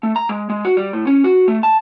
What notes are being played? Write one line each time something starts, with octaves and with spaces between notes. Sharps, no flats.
A3
A#5
G#3
G#3
F#4
G3
A2
C#4
F#4
A3
A5